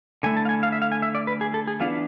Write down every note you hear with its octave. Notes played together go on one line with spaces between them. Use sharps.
D3 A3 E4 G#5
A5
F5
G#5
F5
E5
F5
G#5
E5
D5
B4
G#4
A4
G#4
E3 B3 D4 F4